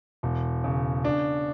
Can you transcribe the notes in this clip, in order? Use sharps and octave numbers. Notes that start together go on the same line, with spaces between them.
E1
C#3
D4